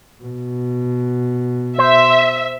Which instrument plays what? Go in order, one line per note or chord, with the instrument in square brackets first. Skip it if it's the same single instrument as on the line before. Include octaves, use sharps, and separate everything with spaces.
[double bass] B2
[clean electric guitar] C5 [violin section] E5